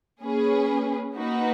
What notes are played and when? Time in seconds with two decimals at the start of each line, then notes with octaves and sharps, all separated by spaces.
0.21 A#3 C#4 G#4 B4
1.15 A#3 D#4 F#4 B4